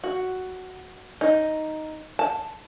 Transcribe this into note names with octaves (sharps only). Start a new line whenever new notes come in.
F#4
D#4
A5